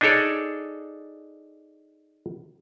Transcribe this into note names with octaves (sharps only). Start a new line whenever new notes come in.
D4 D#4 G#4 A4 C#5 D5